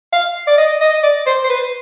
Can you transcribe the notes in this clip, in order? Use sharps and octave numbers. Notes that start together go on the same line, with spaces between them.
F5
D5
D#5
D#5
D5
C5
C5
B4